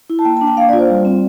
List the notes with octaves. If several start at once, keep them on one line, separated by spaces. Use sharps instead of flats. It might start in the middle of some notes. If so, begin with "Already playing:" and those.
E4
A5
A#3 G5
A5
D4
G5
A#3 F5
D5
F4
C5
G3
C4